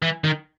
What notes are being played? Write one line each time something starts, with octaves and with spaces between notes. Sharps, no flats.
E3
D#3